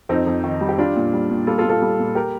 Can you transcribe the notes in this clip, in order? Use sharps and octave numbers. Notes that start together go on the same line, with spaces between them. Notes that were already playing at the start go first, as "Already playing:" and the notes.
F2 C4 D#4
F2
D#3
G3
G4
G3 D4 F4
A#2
G3
A#2
G3 F4 A4
F4 A4
A#2
F4 A4
G3
A#2
G4 A#4